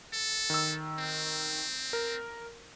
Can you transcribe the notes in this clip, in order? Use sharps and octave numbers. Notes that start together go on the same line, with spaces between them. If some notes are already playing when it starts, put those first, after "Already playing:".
A4
D#3 E6
C4
A#4